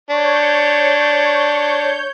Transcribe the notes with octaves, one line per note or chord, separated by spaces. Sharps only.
D4 C#5 G6